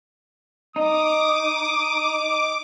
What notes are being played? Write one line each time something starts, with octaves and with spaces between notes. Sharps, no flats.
D#4 D6 D#6